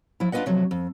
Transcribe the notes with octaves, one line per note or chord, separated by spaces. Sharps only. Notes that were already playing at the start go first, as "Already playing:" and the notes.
F3 E4
D4 F4 F#4 B4 D#5 F#5
C3 F3 F#3 A3
F2